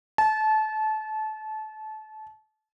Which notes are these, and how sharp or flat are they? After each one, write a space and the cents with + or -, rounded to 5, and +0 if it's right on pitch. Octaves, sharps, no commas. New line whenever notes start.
A5 -25